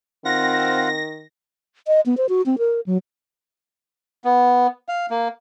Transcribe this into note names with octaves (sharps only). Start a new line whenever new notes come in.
D#3 C4 F4 F5 F#5 A#6
D#5
B3
C5
F#4
C4
A#4
F#3
B3
F5
A#3